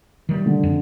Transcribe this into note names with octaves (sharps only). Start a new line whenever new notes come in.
D#3 G3
D3
F2